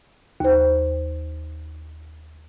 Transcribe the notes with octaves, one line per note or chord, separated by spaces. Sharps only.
D#2 C5